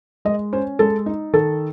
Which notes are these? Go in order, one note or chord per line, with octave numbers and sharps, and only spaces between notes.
G#3 D#5
C#4 C5
G#3 A4
D#4
D#3 A4